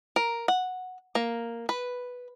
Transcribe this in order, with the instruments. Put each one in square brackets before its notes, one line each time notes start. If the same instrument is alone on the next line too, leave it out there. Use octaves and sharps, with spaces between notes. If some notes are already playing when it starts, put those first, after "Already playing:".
[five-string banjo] A#4
F#5
A#3
B4